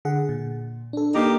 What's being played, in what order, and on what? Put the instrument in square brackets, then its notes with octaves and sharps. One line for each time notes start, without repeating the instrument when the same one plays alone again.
[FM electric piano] D3 G#4 F#5
A#2
D4 A4
[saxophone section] A#3 D#4 G4